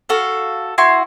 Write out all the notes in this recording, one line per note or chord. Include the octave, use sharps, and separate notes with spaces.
F#4 A4 F5
E4 F#4 C6